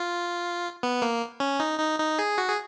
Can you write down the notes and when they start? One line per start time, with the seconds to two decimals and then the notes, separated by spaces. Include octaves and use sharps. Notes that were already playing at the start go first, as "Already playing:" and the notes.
Already playing: F4
0.83 B3
1.02 A#3
1.40 C#4
1.60 D#4
1.79 D#4
1.99 D#4
2.19 G#4
2.38 F#4
2.49 G#4